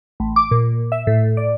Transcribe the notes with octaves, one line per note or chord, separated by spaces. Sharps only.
A1
D6
A#2
E5
A2
D5